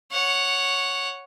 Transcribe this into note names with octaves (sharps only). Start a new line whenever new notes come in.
C#5 F#5